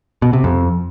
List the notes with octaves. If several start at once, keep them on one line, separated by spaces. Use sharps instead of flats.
B2
C3
F2